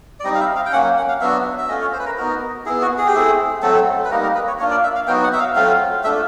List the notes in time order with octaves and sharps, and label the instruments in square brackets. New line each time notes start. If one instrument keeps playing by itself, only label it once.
[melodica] D5
G3 C4 D#4 D#5
F5
E5
F5
G5
F#3 A#3 C#4 F#5
F#5
F5
F#3 B3 D4 F#4 E5
E5
A3 C#4 F4 D#5
C#5
C5
B4
A#4
B3 D#4 F#4 A#4
B3 E4 G#4
F#4
G#4
G4
A3 C4 E4 G#4
F#3 A3 C4 A4
B4
G3 A#3 D#4 A#4
A#4
B4
C#5
A#3 D4 F4 C#5
D5
E5
F5
F#3 B3 D#4 F#4 G5
F#5
E5
F5
F#3 A3 C4 F4 F5
A3 D4 F4 E5